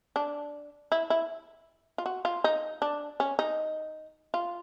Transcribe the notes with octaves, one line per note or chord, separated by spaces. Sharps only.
D4
E4
E4
F4
F#4
F4
D#4
D4
C#4
D#4
F4